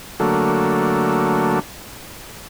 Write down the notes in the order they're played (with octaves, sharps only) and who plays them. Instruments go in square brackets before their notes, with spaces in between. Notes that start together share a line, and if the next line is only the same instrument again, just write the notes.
[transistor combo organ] D3 F#3 A3 A#3